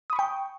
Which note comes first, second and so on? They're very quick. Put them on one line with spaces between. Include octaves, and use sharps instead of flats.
D#6 B5 C#6 G5